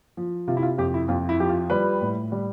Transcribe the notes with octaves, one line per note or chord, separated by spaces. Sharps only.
F3
C3 F4
E4
F4
F2 G4
E4
F2 F4
E4
F3 G4
F4
G3 B4
A2
G3